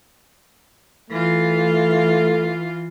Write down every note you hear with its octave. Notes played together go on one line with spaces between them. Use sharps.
E3 A3 F4